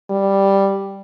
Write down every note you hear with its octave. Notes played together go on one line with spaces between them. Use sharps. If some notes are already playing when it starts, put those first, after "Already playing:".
G3